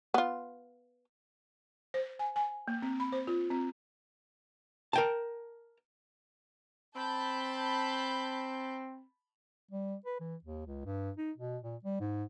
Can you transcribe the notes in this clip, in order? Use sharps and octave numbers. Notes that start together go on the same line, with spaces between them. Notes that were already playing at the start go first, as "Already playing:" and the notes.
B3 F4
C5
G#5
G#5
A#3
C4
B5
C5
F4
C4
A#4 G5 A5
C4 A5 B5 G6
G3
B4
E3
D#2
C#2
G2
D#4
B2
A#2
G3
G#2